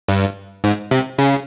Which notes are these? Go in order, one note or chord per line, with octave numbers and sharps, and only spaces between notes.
G2
G#2
C3
C#3